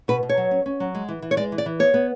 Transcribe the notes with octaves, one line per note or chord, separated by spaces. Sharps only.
B2 B4
B2
C#5
F#3
C#4
C#4
F#3
G#3
E3
E3
C#5
G#3 D5
E3
D5
E3
B3 C#5
B3